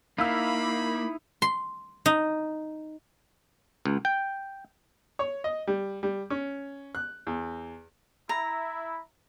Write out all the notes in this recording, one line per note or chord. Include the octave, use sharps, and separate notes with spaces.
A#3 D#4 E4 F5 B5 E6
C6
D#4
C#2
G5
C#5
D#5
G3
G3
C#4
F#6
E2
E4 A#5